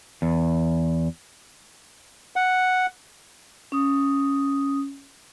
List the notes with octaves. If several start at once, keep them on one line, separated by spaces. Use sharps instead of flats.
E2
F#5
C#4 D#6